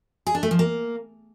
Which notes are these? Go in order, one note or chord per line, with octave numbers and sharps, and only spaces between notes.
G#4
D4
A3
F3
A#3